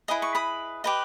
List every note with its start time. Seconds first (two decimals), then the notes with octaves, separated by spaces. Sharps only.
0.08 E4 G#4 B4 D#5 D#6
0.22 C#6
0.35 B5 D#6
0.84 G4 B4 D#5